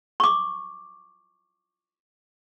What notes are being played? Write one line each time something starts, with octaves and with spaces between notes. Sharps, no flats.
C#6 D6